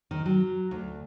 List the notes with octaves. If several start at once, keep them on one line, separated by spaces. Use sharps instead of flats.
D#3
F#3
D2